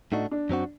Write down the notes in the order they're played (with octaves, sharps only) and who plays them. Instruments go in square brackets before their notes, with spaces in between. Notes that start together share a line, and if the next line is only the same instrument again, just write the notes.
[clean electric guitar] A2 A3 D4 F#4 [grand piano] D#4
[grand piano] D4
[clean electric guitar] F#2 F#3 C4 F#4